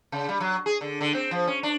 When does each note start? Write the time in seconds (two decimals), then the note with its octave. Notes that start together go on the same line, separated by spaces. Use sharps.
0.12 C#3
0.29 G3
0.40 F#3
0.66 G#4
0.81 D3
1.01 D3
1.14 C4
1.31 F3
1.47 C#4
1.63 D4